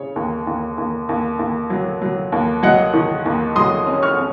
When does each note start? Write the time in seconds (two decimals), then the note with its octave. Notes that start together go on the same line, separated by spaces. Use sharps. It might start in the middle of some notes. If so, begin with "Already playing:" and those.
Already playing: C#3 C#5
0.16 D#2
0.47 D#2
0.78 D#2
1.09 D#2
1.39 D#2
1.70 F#3
2.02 F#3
2.32 D#2
2.63 F#3 D#5 F#5
2.94 D#3
3.26 D#2
3.56 F#3 C6 D#6
3.87 C#4
4.02 C#6 F6
4.17 C#4